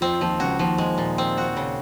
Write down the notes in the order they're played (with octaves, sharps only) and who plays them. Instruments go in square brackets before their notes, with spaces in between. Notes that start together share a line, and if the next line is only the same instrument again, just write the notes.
[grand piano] F2 F3 [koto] C4
[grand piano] D#2 D#3 [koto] F3
[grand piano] C#2 C#3 [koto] F#4
[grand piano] D#2 D#3 [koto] F3
[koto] G#3
A#2
C4
F#4
C#3